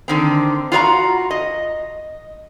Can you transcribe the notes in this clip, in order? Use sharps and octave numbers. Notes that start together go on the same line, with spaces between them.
D3 D#3 C4
F4 F#4 D5 A#5
D#5